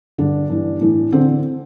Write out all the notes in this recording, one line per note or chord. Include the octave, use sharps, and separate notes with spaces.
G2 D3 D4
G2 E3
A2 E3
D3 C4